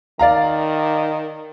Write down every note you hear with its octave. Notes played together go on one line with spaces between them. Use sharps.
D#3 D5 F5 A#5